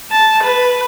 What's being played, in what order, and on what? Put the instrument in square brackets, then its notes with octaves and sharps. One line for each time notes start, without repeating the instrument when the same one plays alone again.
[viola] A5
B4